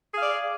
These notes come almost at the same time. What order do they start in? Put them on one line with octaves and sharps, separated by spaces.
G#4 F5 D5